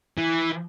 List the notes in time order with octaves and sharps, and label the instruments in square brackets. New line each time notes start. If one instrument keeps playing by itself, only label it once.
[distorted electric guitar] E3